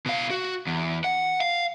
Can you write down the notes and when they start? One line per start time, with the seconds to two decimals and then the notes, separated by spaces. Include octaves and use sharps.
0.06 B2 F5
0.30 F#4
0.67 E2
1.04 F#5
1.41 F5